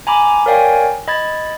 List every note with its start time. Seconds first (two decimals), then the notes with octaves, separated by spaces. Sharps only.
0.07 G#5 A#5 B5 D6
0.46 A#4 C#5 D5 F5 G5 G#5
1.08 D#5 B5 G#6 A6